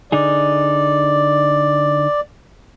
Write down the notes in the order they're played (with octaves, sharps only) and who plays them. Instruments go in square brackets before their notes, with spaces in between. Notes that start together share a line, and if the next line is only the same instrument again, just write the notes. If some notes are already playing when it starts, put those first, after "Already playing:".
[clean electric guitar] D3 D#4 G#4 [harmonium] D5